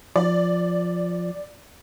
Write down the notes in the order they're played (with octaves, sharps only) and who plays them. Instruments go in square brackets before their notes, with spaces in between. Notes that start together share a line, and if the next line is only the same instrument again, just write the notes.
[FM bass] F3 [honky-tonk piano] D5